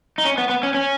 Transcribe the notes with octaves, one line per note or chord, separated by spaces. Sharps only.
D#4
C#4
B3
B3
C#4
C#4